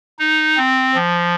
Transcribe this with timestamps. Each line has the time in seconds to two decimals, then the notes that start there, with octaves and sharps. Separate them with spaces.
0.19 D#4
0.57 C4
0.94 F3